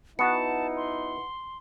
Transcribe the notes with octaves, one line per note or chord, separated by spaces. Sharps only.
B3 D#4 E4 F#4 B4 F#5 A5 C#7
C6